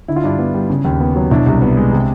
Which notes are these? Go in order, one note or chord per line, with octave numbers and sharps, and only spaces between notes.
D3 E4
F4
G2 D4 E4
B3
G3
C#3
D#2
B3
F#3
B2 D4 E4
C2
B3
G#3
C3